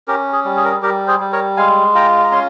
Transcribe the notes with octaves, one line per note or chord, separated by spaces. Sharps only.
C#4 G4 A#4
G#4
G3
G#4
A#4
G#4
G3 G4 A#4
G#4 C5
G3
A#4 C#5
G#3 F5 G#5
F4 G5 A#5
A#5
C#4 G#5 C6